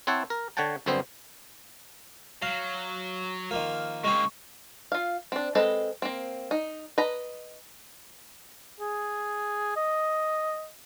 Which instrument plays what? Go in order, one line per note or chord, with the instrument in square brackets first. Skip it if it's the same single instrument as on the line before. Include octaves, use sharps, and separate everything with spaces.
[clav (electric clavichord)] C4 E4 C5 C#5 F#5 A5
A#4
D3 C#5 F#5 G5 A5
G1 F#2 D3 B3 C4 C5
[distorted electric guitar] F#3 [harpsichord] F5
[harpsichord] D#3 F3 A#3
[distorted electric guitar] C#3 A#3 [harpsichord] G#3 C4 [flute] C#6
[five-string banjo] F4 F5
C4 D4
G#3 C4 A4 B4 D#5
A#3 C4
D#4
B4 D#5 A#5
[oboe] G#4
D#5